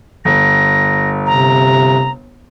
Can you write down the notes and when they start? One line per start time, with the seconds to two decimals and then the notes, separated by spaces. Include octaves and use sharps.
0.25 G1 A#6
1.26 C3 A#5